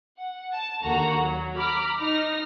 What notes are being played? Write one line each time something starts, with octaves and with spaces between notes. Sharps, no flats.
F#5
A5
D#2 D3 A#3 F#4 A#5
F#3
A#5 B5 D6 F6
D#4 F6 A#6